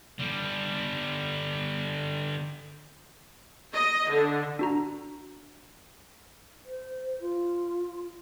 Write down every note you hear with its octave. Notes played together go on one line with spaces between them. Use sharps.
D3 G3
D#5
D3
D4 F#4 A#5
C5
F4